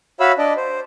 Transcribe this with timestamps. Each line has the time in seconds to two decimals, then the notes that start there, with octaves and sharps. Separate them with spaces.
0.20 F#4 C#5 E5 F5 B5 E6
0.38 D4 D5 D#5
0.57 C5